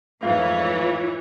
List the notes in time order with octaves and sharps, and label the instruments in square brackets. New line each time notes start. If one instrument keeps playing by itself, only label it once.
[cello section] F2 G#2 [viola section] E3 E4 C#5 [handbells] A3 F5 [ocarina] F4